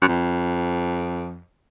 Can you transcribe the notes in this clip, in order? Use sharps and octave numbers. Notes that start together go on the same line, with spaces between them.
F#2
F2